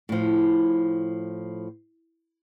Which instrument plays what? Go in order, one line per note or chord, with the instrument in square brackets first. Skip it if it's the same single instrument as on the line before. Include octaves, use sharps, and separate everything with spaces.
[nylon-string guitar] A2 F3